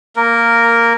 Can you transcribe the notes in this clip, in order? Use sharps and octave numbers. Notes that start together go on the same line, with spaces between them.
A#3 A#4